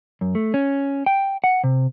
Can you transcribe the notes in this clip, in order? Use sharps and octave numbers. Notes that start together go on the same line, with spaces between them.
F#2
A3
C#4
G5
F#5
C3